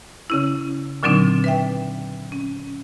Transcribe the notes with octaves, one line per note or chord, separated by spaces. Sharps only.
C#3 C#4 E4
A#2 D3 F#3 C4 D4 D#4
B4 E5 G5
C#4